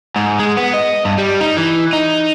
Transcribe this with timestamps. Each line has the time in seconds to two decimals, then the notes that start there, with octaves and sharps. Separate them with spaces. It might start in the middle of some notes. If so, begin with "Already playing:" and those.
0.16 G#2
0.40 G#3
0.57 B3
0.74 D#5
1.05 G2
1.18 G3
1.40 D#4
1.57 E3
1.93 D#4